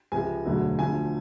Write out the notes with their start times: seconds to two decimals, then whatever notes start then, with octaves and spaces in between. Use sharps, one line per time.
0.12 C#2 C3 F3 G#5
0.45 E1 D2 D3 F#3
0.78 D2 D3 F3 G#5